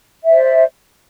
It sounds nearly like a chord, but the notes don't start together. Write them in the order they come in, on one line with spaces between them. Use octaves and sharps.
E5 D5 C5